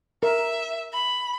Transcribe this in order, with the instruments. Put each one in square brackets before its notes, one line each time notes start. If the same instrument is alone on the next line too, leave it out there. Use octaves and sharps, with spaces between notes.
[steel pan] A#4 [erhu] E5
[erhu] B5